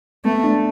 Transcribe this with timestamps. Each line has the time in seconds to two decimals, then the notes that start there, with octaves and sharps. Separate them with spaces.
0.25 A3 B3
0.43 D4